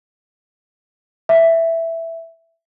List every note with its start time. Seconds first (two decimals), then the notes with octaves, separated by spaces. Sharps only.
1.29 E5